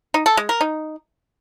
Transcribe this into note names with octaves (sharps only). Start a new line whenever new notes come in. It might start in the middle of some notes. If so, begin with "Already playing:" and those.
D#4
A4
G#3
A#4
D#4